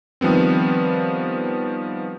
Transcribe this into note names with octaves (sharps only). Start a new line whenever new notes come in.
D#3 F3 G3 B3 C4